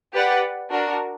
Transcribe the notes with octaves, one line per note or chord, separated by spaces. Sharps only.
G4 B4 D5 F#5
D4 F#4 A#4